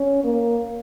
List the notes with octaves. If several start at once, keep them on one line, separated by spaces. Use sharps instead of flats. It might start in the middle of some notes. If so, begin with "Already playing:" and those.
Already playing: C#4
A#3